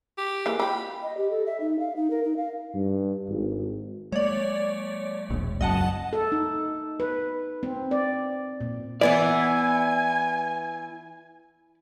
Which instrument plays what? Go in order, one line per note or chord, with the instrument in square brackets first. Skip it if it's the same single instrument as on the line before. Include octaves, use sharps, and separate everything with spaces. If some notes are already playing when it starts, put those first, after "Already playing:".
[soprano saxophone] G4
[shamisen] E3 A#3 G#4
[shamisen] F4 G4 [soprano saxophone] B5
[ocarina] D#5
G4
A4
E5
D#4
F5
D#4
A#4
D#4
F5
[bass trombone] G2
G#1
[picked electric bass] G#3 A#3 [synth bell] C#5 D5
[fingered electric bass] E1 A#1
[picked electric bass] D1 C#2 F#3 [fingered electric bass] F#2 [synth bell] D#5 F#5 A5
[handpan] A4
D#4
B4
C4
D5
A#2
[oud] E3 B3 E4 [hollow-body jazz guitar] D5 [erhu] G#5